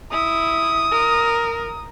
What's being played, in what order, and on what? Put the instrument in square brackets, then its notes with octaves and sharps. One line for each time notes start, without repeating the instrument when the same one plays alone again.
[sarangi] E4 [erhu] D#6
[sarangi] A#4